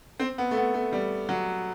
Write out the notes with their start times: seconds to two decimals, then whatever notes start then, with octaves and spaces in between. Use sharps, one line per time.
0.19 C4
0.38 B3
0.51 A3
0.57 B3
0.74 A3
0.92 G3
1.29 F#3